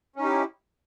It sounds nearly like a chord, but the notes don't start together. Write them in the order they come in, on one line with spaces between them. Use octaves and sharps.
C#4 D#4 G4 E4